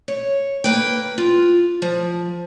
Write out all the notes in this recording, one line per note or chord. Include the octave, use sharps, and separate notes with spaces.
C#5
A#3 B4 G5
F4
F3